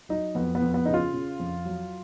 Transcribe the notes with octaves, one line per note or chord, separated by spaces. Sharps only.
F#3 D#4
F2 B3
B3
F2
B3
C#3 D#4
F4
C#3
F2
F#3